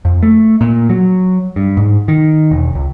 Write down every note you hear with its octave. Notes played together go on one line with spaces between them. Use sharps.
F2
A3
A#2
F#3
G2
G#2
D#3
E1
C#2